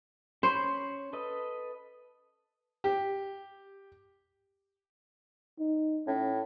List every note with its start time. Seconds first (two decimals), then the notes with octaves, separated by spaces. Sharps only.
0.43 C#4 C5 C#5 B5
1.13 A4 B4 D#5
2.84 G4
5.59 D#4
6.07 A2 C#4